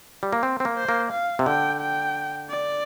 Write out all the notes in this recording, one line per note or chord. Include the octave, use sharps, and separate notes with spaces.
G3
A#3
C4
C4
A#3
C5
A#3
F5
C3
D3 G5
G5
D5